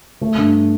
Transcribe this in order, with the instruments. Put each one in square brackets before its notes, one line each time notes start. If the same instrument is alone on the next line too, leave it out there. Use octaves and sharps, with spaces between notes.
[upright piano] A3
G2